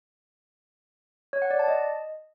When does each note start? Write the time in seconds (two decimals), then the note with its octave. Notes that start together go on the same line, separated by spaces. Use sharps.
1.33 C#5
1.42 F#5
1.51 D5
1.59 A5
1.68 D#5